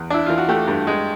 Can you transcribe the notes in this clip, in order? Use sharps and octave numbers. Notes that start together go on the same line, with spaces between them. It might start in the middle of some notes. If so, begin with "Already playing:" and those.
Already playing: E2
D4 E4
E3 F4
F#4
A3 G4
G2
G#3